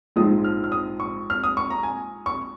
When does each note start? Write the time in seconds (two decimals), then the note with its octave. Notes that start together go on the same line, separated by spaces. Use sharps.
0.16 A#1 G#2 F3 G#3 D#4 D#6
0.44 F6
0.64 F6
0.72 D#6
1.00 C#6
1.30 F6
1.44 D#6
1.57 C#6
1.70 A#5
1.83 G#5
2.26 C#6